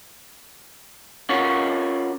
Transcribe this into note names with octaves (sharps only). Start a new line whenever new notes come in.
C#4 F4 F#4 A#4 C#5